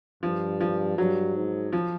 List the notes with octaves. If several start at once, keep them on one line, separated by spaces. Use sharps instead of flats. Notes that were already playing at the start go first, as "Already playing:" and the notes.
G2 F3
F3
G2 F#3
G#2
F3